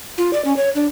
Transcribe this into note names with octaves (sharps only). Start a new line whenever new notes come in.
F4
D5
C#4
C#5
D4